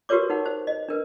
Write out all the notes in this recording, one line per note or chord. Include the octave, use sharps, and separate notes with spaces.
F#4 G4 A#4 B4 C#5 D6
D#4 A#4 F#5
C5
D#5
D4 A#4 B4